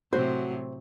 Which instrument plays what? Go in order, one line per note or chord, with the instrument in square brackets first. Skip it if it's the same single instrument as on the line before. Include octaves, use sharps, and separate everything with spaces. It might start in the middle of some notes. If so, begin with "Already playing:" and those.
[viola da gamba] A2 C3 F#3 [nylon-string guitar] F#4 [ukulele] C5